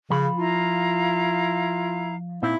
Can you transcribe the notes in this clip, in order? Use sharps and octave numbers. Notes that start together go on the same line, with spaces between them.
C#3 F3 B5
E4 F4 F5 A#5
A#2 C4 D#4 E4